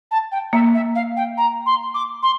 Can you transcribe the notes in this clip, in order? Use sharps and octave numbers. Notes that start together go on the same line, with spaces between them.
A5
G5
A#3 E5
E5
F5
G5
A#5
C6
D6
C6